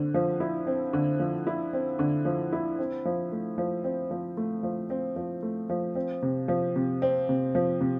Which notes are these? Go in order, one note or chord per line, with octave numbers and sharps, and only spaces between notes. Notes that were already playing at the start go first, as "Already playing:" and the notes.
Already playing: D3 C4
F3
E4
C4
D3
F3
E4
C4
D3
F3
E4
C4
F3
A3
F3
C4
F3
A3
F3
C4
F3
A3
F3
C4
C3
F3
C3
C4
C3
F3
C3